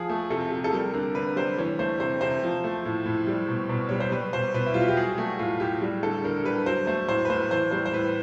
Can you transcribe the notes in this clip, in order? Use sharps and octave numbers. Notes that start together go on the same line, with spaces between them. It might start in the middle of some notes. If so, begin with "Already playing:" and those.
Already playing: F3 G#4
A3
C3 A4
C3
A4
G3 A#4
D3 A#4
D3 B4
G3 C5
E3 C#5
A3 C5
C3 C5
C3 C5
F3
A3
A2
A2
G3
B2
B2
G3 C#5
C5
G3 B4
B2 C5
B2 B4
E4
G3 F4
F#4
G4
F#3 G#4
A3 F#4
A2 F4
A2 G4
G3
D3 A4
D3 A#4
G3 B4
F#3 C5
A3 C5
A2 C5
B4
A2 C5
E3 C5
G3 C5
C5
A2 B4